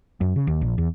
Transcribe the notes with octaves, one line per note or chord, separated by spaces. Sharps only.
F#2
C#3
D#2
A#1
E2